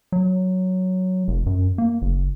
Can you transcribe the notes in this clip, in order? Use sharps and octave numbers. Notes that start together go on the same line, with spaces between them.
F#3
F1
F#2
A#3
F#1